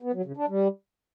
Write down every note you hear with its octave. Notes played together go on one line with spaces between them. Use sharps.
B3
F#3
C#3
D4
G3